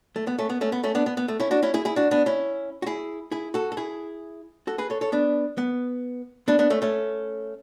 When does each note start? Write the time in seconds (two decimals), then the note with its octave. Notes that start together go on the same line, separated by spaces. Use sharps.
0.16 A3
0.27 B3
0.39 A3 C#4
0.50 B3
0.61 A3 C#4
0.72 B3
0.84 A3 C#4
0.95 B3 D4
1.06 B3
1.17 B3
1.28 A3
1.40 C#4 E4
1.51 D4 F#4
1.63 C#4 E4
1.74 E4 G#4
1.85 E4 G#4
1.96 D4 F#4
2.11 B3 D4
2.26 C#4 E4
2.82 F#4
2.86 E4 G#4
3.31 E4 G#4
3.54 F#4 A4
3.72 A4
3.77 E4 G#4
4.67 F#4 A4
4.78 G#4 B4
4.90 A4 C#5
5.01 A4 C#5
5.12 B3 D4
5.58 B3
6.48 B3 D4
6.59 B3 D4
6.70 A3 C#4
6.82 A3 C#4